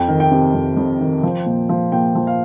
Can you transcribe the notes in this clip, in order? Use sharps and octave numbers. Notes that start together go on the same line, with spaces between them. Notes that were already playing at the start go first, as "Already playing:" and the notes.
Already playing: F2 G5
D#3
G5
C3
F2
F2
D#3
F3
A#2
F3
A#2 G5
F3
F5